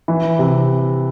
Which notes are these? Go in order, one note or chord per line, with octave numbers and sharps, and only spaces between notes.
E3
C3